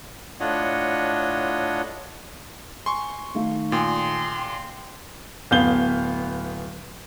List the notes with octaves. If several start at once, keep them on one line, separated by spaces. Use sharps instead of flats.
A2 D4 F4 C#5 D#5 F#5
G#5 C6 C#6
D#3 A3 D#4 F5
A#2 G5 G#5 C6 D#6
G5
D1 B3 F5 G6 G7